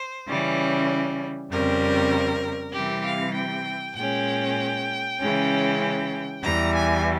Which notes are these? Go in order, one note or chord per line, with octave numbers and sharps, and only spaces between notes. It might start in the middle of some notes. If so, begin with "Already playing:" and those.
Already playing: C5
C#3 E3 G3 C#4
F2 C#3 G3 C4 A#4
C3 E3 G3 C4 G4
F5
G5
A#2 G#3 C#4 G5
C#3 E3 G#3 C#4
E2 E3 G3 A#5
G#5